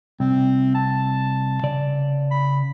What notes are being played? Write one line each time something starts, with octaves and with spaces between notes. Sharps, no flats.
C2 C4
A5
C#3 D5
B5